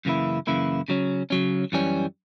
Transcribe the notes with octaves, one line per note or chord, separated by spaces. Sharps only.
F#2 C#3 E3 A#3 E4
F#2 C#3 E3 A#3 E4
C#3 F#3 C#4
C#3 F#3 C#4
F#2 E3 G3 C#4